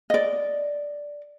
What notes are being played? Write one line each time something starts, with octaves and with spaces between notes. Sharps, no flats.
D5 D#5